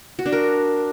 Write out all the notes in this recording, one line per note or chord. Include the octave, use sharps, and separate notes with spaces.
F#4
D4
A#4